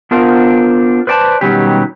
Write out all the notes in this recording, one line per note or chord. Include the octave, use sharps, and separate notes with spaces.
B3 D4 F4 A#4 C5 F5
B4 C5 D5 G5 A5
B2 D#3 F#3 G3 C#4 G4